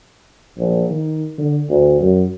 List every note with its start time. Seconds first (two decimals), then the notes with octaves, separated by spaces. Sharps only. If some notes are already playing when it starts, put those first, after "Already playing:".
0.58 A#1
0.90 D#3
1.38 D3
1.70 D2
2.01 F#2